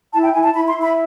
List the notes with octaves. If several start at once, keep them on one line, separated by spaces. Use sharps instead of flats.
E4 A5
G5
E4 G#5
A5
E4 B5
C6
E4
B5